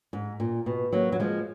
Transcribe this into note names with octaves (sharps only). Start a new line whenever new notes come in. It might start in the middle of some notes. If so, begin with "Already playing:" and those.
G#2
A#2
B2
F#3 A#3
F#3
F3 G#3